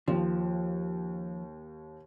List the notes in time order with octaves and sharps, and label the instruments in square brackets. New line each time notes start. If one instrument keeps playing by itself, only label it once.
[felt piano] D#2 [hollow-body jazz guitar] F3